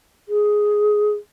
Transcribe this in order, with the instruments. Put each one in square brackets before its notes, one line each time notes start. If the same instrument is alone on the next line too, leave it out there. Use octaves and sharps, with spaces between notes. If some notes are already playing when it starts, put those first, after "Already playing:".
[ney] G#4